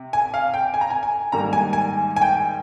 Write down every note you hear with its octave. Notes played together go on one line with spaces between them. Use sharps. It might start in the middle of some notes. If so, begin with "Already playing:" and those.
Already playing: C3
G#5
F5
G5
G#5
A#5
G#5
G#5
G#2 D#3 G3 A#3 A#5
G#5
G#5
G#5
G5